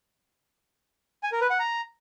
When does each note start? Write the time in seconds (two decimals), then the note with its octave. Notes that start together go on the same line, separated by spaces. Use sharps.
1.23 G#5
1.32 A#4
1.41 B4
1.50 F#5
1.59 A#5